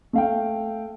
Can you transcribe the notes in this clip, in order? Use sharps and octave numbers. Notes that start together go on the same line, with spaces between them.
A3 F5 G5